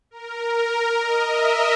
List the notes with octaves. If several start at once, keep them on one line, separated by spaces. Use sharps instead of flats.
A#4
D#5
E5